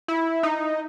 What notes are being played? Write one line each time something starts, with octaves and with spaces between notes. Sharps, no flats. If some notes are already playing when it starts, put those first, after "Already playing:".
E4
D#4